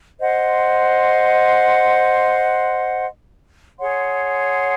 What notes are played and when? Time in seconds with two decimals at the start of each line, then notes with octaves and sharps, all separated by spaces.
0.19 C5 D#5 F#5 C6
3.78 G#4 C#5 F#5 C6